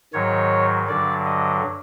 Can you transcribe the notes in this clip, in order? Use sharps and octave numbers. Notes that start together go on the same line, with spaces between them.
G#2 D#3 F#3 C#5
G2 D3 F#3 D5
D#5